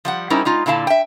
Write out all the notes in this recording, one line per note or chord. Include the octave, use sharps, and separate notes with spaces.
F3 G3 F#5
G3 C#4 D#4 E4 A#4 C5
G#3 D#4 F4
A#2 D3 E4 F5 A5
E5 G5